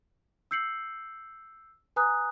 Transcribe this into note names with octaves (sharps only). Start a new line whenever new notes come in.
E6 G6 C7 C#7 F#7
B4 G#5 A#5 D#6 F#6